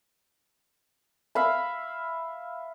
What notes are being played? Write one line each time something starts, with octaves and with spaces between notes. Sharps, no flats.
E5 F5 B5